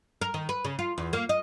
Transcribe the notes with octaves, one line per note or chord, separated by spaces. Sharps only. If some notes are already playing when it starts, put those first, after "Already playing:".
A#4
D#3
B4
C#3
F4
E2
A#3
D#5